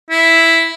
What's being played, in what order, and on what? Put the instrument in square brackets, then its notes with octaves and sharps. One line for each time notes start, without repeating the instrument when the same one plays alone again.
[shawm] E4